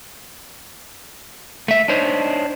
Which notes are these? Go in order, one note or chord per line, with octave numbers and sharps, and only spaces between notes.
A3 E5
D4 D#4 C5 C#5 D#5